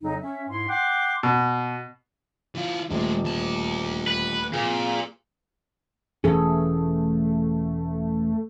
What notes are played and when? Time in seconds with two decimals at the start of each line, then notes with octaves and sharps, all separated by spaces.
0.02 F2 C#3 F#3 D#4
0.21 C#4 E5
0.49 G#2 E4 C6
0.68 F#5 G5 C6 D6
1.23 B2
2.55 E3 F4
2.90 D#1 A2 G#3
3.24 D2 A5
4.07 B4
4.54 A#2 G#4 B4
6.24 E1 E3 A3 C#4 G#4 A4